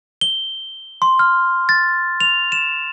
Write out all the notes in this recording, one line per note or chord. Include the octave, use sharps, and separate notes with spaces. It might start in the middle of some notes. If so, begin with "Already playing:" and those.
G7
C6
F6
A6
F7
E7